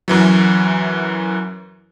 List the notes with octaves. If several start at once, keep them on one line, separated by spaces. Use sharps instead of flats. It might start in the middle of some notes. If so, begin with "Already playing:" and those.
F#2 E3 F#3